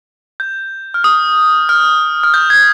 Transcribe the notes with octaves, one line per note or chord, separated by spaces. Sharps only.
G6
F6
D#6
F6
F6
G6
G#6